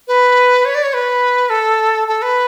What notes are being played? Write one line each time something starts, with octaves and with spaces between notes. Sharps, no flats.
B4
C#5
D5
C#5
B4
A4
A4
B4